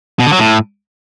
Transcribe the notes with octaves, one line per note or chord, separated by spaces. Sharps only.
B2
D3
F#3
A2